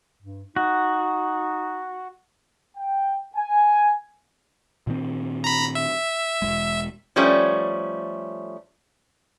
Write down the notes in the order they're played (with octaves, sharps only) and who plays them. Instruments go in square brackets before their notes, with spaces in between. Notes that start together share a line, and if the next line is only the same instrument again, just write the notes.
[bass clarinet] G2
[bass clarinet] D#4 [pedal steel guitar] F#4
[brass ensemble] G5
G#5
[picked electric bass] A#2 D#3 C4
[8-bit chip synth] A#5 B5
E5
[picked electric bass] E1 D#2 G#3
[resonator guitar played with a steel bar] F3 G3 A3 C#4